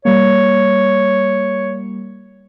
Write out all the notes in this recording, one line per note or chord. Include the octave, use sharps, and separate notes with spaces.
G3 A#3 C#5